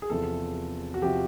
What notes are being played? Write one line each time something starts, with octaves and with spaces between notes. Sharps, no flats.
G#4
E2 C3 F3 A4
F#4
C3 F3 G4